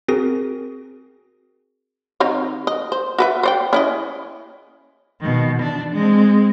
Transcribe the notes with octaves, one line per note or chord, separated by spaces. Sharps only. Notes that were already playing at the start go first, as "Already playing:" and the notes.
C4 F#4 G#4 A#4 A#6
D#3 C4 C#5
D#5
C5
F#4 B4 E5
C5 D5 G5
C#4 E4 D#5
B2 D#3
E3 D4
G#3 C4